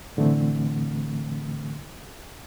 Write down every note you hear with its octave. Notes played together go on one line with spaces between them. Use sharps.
A2 D3 E3 A3 C4